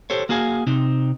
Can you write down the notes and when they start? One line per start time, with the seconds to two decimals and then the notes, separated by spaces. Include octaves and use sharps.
0.10 G4 A4 C5 C#5
0.29 A#3 F#4 G#4 F5 G#5
0.67 C3 C4 D#4